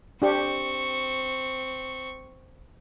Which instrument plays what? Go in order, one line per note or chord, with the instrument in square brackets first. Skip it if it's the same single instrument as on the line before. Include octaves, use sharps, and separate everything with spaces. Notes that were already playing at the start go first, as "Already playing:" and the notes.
[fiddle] C4 C#6 [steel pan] D4 G4